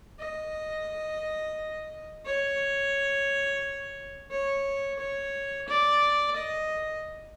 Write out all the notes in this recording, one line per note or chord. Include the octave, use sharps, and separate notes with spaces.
D#5
C#5
C#5
C#5
D5
D#5